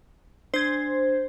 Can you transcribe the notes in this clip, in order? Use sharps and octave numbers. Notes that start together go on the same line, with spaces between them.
D4 C5 G#6